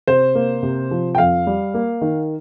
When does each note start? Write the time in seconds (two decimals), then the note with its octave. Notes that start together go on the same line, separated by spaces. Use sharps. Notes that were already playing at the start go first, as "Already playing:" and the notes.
0.07 C3 C5
0.35 A#3
0.63 C3
0.91 F3
1.15 G5
1.18 F2 F5
1.47 G3
1.74 A#3
2.01 D#3